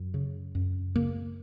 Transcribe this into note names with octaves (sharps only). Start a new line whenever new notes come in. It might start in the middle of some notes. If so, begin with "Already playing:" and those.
Already playing: F#2
C#3
F#2
C#3 A#3